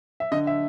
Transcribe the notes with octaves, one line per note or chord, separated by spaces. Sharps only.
E5
D3 D#5
E5